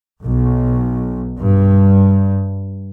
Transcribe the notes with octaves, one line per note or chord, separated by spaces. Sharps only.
B1
G2